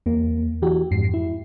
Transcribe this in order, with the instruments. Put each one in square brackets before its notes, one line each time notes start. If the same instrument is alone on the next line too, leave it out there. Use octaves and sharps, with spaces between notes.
[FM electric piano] E2 A#3
E3 F#4 G4
F2 G#2 C7
E4